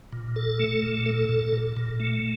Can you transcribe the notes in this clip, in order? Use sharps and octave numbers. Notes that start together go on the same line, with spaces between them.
A#2
A4
A3
A#2
A4
A#2
A#2
A#2
A3